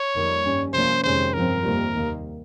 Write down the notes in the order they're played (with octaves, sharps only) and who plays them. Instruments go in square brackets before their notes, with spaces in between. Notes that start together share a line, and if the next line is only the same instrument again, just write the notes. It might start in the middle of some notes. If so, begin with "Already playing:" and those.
Already playing: [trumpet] C#5
[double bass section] F2 D#3 G3 A#3
G2 G3 C#4
[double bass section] C3 F3 A#3 C#4 [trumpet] C5
[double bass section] F2 C3 D#3 G#3 C#4 [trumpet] C5
[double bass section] G2 F3 C4 [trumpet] A#4
[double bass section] F2 C3 D#3 G3 A#3
D#2 D#3 A#3